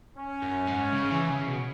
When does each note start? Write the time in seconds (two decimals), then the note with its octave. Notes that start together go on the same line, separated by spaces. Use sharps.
0.17 C#4
0.42 F#2
0.67 G#2
0.93 C#3
1.11 E3
1.30 C#3
1.47 B2